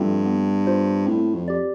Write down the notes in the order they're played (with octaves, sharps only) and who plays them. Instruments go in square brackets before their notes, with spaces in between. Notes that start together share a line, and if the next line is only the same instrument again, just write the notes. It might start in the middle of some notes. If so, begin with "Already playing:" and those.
Already playing: [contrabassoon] G2 [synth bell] F3 A3 C4 F4 A4
[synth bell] B3
F4 C5
[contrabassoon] A2 [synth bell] C4
[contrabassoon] F2
[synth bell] G4 D5